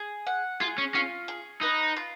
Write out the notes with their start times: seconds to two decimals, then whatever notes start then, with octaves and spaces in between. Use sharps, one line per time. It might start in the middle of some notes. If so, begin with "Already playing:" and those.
Already playing: G#4
0.27 F#5
0.60 F4 G#4
0.78 C#4
0.94 C#4 F4
1.28 G#4
1.62 D#4 B4
1.96 F4